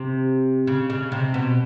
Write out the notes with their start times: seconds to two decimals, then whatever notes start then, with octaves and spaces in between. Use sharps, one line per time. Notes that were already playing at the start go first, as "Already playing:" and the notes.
Already playing: C3
0.67 C#3
0.90 C#3
1.12 C3
1.34 B2